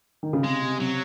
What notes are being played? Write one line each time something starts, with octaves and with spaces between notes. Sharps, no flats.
D#3
C#3
C3 G#3
C3
C3 F#3